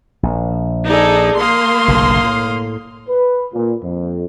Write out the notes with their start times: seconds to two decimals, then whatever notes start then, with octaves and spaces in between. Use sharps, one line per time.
0.23 A#1
0.87 D#4 G#4 A4 D5
1.39 A#3 F5 C6 D#6
1.88 F#1 B1 D3
2.24 A2
3.08 B4
3.53 A#2
3.83 F2